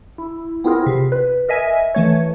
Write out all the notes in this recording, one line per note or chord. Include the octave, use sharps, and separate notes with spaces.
E4
B3 C4 E4 F4 G#4 A#4
C3
B4
A#4 D#5 E5 G#5
E3 A3 C#5